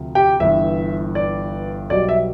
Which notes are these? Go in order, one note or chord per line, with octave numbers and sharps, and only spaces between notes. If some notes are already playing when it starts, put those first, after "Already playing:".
Already playing: D2 C3 F3
G4 G5
G1 G2 E3 E5
D5
B1 B2 G3 D5
E5